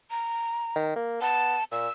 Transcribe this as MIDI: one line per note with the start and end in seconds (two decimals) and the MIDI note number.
0.11 0.80 82
0.76 0.94 51
0.96 1.18 58
1.21 1.57 59
1.21 1.64 81
1.72 1.88 46
1.72 1.91 88